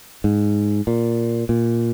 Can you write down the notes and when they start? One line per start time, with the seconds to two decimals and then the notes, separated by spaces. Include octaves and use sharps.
0.24 G#2
0.87 A#2
1.49 A#2